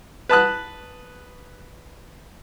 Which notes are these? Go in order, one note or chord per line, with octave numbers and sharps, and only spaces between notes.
B4 A5 D#6 F#6